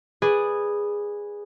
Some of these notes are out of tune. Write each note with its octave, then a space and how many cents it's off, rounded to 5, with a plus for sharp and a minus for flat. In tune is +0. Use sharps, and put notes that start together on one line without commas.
G#4 -10 B4 -5 D5 +0